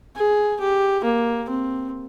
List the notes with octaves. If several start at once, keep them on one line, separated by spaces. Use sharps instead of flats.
G#4
G4
A#3
C4